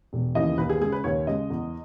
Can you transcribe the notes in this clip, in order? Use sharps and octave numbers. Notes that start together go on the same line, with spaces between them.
E1
D#2 C#3 E3 D#5
D#2 B4
G#4
C#3 G#3 G#4
B4
D#2 C#5
C#3 G#3 D#5
E2